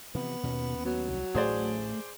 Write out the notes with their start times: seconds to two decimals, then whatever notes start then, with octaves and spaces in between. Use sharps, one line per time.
0.15 C3 E3 F3 B3
0.44 D#2 B2 C#4
0.85 F#3 B3
1.08 C2
1.35 A1 D2 A2 A3 G#4 C5 D5